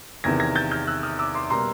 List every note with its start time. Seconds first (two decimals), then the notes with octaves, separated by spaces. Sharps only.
0.24 E2 C3 D#3 G#6 A#6
0.40 G#6 A#6
0.55 G6 A6
0.71 F6 G6
0.87 E6 F#6
1.03 D#6 F6
1.19 D6 E6
1.34 C6 D6
1.50 B2 G3 A#3 A#5 C6